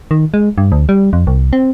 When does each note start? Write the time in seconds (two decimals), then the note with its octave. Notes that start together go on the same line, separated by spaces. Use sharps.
0.11 D#3
0.34 G#3
0.58 G2
0.72 D2
0.89 G3
1.13 F2
1.27 C2
1.53 C4